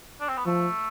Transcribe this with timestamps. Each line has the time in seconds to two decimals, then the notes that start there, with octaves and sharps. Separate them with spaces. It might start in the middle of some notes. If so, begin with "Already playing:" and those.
0.21 D4
0.29 C4
0.37 B3
0.45 F3 A3